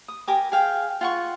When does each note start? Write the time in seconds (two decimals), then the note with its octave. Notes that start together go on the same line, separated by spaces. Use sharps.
0.08 D#6
0.28 G4 A#4 G#5 D6
0.52 G#4 F5 G5
1.01 F4 F#5 C#6